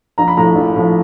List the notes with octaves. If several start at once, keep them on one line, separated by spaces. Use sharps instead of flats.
A#1 A#5
B5
A2 F3 A#5
A#1
A2 F3